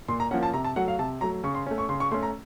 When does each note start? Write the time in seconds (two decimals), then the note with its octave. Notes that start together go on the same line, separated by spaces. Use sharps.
0.08 A#2 C6
0.20 A#5
0.31 F3 A#3 C#4 F#5
0.43 A5
0.53 C3 A#5
0.64 A5
0.76 F#3 A3 F#5
0.88 F5
0.99 C3 A5
1.21 F#3 A3 A#5
1.43 C#3 C#6
1.55 C6
1.67 A3 C#4
1.78 C#6
1.89 C#3 C6
2.00 C#6
2.11 A3 C#4 C6
2.23 A#5